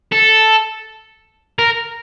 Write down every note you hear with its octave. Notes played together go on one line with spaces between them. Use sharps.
A4
A#4